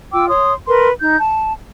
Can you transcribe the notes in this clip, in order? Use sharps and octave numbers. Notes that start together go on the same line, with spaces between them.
F4 G5 D6 E6
C#5 C6 D#6
A#4 B4 C6
D#4 G6
A5